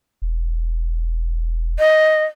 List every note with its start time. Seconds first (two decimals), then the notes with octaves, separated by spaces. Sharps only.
0.22 E1
1.79 D#5